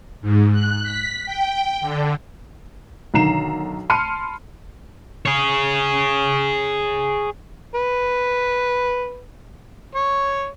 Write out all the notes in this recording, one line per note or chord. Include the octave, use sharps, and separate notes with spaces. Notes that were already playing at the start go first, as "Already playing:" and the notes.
G#2
F#6
B6
G5
D3
B1 D3 D#3 A#5 C7 E7
A5 B5 C6 F6 C#7 D#7
G#4 C#5
B4
C#5